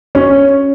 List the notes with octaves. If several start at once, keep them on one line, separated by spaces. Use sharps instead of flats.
C#4